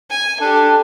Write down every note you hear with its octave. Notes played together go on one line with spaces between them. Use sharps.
G#5
D4 G4 A4